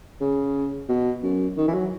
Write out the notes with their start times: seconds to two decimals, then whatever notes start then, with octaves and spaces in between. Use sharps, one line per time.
0.21 C#3
0.89 B2
1.23 F#2
1.57 D#3
1.68 E3
1.74 F#3